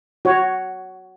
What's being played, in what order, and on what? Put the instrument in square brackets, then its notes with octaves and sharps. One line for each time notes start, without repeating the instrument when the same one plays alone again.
[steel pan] F#4 C#5